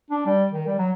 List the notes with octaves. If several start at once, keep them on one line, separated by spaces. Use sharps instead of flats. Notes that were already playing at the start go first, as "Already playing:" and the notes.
D4
G3
D#3
G3
F#3